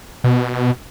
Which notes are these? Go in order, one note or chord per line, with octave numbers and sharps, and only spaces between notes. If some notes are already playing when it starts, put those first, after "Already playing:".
B2